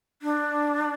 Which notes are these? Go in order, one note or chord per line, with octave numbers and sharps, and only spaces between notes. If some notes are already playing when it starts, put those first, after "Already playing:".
D4